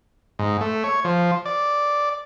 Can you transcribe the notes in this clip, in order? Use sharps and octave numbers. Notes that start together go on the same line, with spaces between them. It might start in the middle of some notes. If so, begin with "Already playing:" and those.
G#2
A3
C#5
F3
D5